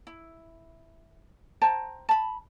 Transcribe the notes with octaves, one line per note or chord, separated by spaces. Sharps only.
E4
C5 G5 A5 A#5
A5 B5